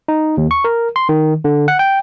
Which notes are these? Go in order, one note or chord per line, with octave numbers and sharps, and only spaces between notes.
D#4
D#2
C#6
A#4
C6
D#3
D3
F#5
G5